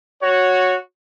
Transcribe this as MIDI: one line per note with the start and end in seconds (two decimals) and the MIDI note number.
0.22 0.75 66
0.22 0.75 73